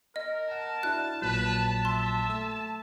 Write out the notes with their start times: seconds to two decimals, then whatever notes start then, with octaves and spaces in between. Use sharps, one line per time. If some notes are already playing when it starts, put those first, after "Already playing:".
0.16 A#4 D#5
0.51 F#5 A5
0.83 D4 E4 F#4 F#6
1.22 A#1 A#2 F#3 B4
1.85 E5 C6
2.30 A3 E6